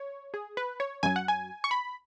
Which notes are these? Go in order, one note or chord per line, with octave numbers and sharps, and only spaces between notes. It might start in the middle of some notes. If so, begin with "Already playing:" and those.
Already playing: C#5
G#4
B4
C#5
F#2 F#3 G#5
F#5
G#5
C#6
B5